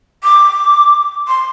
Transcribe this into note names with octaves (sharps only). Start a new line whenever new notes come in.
D6
C6